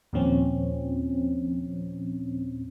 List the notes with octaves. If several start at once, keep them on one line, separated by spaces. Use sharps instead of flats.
D#2 A#2 F3 C4 C#4